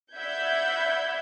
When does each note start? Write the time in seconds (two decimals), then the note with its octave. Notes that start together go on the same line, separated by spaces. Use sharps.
0.13 D5 E5 F#5 B5 G6 G#6